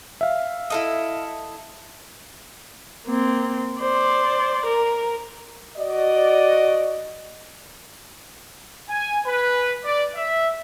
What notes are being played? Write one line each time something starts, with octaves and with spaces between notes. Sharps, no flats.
E5 F5
E4 A4 D#5
A#3 C4
C5 D5
A#4
F#4 D5 D#5
G#5
B4
D5
E5